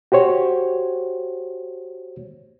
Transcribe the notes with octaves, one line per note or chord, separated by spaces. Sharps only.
F#4 G4 C5 C#5